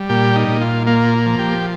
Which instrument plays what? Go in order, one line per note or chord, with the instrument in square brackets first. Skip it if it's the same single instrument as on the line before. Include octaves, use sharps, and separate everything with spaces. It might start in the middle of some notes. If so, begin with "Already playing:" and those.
Already playing: [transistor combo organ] G3
A#2 G4
D#4
A#2
F4
A#3 F4
F3
G4